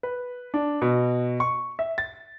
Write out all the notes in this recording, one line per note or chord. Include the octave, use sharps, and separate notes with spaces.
B4
D4
B2
C#6
E5
A6